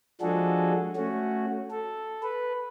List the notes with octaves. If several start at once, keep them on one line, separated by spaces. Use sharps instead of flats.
F3 G#3 D4 F#4 G#4 A4
A3 C#4 F#4
A4
B4